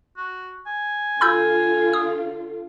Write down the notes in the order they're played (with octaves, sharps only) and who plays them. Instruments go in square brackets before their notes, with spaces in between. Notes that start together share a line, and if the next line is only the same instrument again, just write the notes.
[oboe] F#4
G#5
[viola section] D3 F4 [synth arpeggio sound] B5 E6 G6
[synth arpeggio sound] D#6